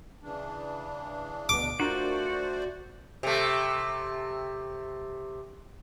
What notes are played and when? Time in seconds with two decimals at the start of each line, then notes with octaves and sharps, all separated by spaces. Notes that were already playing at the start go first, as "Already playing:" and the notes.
0.23 C#3 E3 D4
1.49 D2 B2 D6
1.80 A3 D4 F4 F#4 A#4 C5 D5
3.23 C3 A3